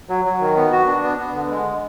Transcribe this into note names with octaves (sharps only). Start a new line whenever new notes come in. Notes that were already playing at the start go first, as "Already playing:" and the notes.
F#3
F#3
D#3
B3
F#4
D4
B3
B3
D3
G#3